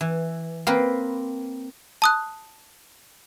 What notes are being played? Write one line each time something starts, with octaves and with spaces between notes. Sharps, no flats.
E3
A#3 C4 A#4 B4
A5 D#6 F#6